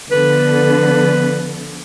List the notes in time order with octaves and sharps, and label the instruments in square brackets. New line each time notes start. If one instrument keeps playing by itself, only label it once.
[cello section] D3 F3 B3 [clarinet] B4